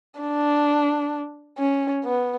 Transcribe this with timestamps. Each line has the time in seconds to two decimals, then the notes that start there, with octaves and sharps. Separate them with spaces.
0.21 D4
1.58 C#4
2.05 B3